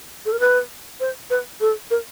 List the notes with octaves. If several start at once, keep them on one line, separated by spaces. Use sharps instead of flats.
A4
A#4
B4
C5
B4
A4
A#4